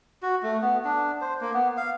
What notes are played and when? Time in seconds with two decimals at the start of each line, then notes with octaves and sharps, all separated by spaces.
0.23 F#4
0.43 A3
0.62 B3
0.85 D4
1.21 C5
1.41 A#3
1.53 B3
1.77 F5